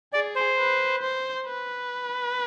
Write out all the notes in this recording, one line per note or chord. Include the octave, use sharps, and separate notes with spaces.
G#4 D5
C5
B4
C5
B4